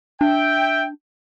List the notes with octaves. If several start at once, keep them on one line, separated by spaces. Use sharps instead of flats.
D4 E5 G5